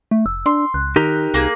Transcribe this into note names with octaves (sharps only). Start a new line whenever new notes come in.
A3
F1 E6
D4 C6
C#2 F#6
D#3 D#4 G4 A#4
C2 A#3 G#4